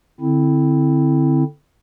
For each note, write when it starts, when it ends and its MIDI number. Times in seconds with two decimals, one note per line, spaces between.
0.20 1.43 50
0.20 1.43 60
0.20 1.43 64